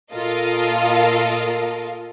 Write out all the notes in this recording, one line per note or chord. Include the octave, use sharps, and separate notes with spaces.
A#2 F4 A4 A#4 D#5 F5